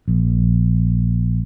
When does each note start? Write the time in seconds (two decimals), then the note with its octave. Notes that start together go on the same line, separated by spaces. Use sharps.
0.08 A#1